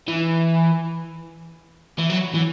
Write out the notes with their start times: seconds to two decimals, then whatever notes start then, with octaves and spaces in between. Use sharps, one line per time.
0.08 E3
1.99 E3
2.10 F#3
2.35 E3